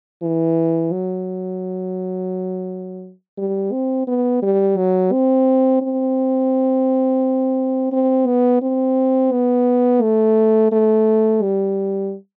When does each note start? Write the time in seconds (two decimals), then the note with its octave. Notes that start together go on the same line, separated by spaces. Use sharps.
0.23 E3
0.92 F#3
3.38 G3
3.72 C4
4.08 B3
4.42 G3
4.77 F#3
5.12 C4
5.82 C4
7.92 C4
8.27 B3
8.62 C4
9.32 B3
10.02 A3
10.72 A3
11.42 G3